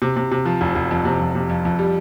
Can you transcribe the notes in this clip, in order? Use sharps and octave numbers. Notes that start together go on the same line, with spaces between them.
C3
C3
C3
F3
F1
F1
F2
C3
F2
C3
F2
F2
G3